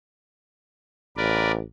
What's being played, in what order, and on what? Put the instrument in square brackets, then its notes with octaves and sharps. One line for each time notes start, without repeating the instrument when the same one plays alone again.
[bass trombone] A1 [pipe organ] A#4 B4 D5